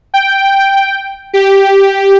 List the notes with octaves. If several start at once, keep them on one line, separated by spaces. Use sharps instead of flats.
G5
G4